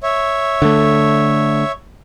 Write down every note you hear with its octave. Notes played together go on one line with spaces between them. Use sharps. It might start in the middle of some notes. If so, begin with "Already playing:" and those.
C#5 E5
D3 A3